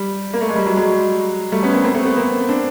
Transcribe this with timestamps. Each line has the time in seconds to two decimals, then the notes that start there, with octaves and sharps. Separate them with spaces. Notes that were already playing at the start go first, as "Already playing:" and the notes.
Already playing: G3
0.34 A#3
0.41 A3
0.49 G#3
0.56 G3
0.66 F#3 G#3
0.77 F#3 G#3
1.52 G3 A3
1.63 B3 C#4
1.73 A#3 C4
1.84 A#3 C4
1.95 A3 B3
2.05 A3 B3
2.16 A#3 C4
2.49 C4 D4